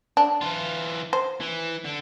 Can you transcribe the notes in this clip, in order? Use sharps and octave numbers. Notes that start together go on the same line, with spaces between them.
D4
E3 F4
C5
E3
D3